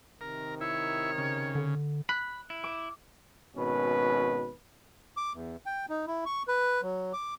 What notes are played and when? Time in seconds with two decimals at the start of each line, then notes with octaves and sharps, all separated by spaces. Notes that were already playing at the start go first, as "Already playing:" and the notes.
0.21 C3 D#3 A#4
0.61 E4 C#5
1.18 C#3
1.55 D3
2.09 B5 F#6
2.50 E4
2.64 D6
3.56 G#1 B2 C#4 B4
5.17 D6
5.34 E2
5.66 G5
5.89 D#4
6.07 E4
6.26 C#6
6.48 B4
6.82 F#3
7.13 D6